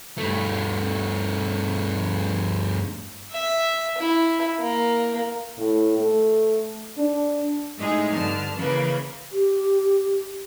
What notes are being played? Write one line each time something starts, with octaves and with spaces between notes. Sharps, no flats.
G2 A3
E5
E4
A#3
A2
A3
D4
A2 G#3 D#4 G#4 E5
G2 D3 A5 F6
C#3 E3 A#3 B4
G4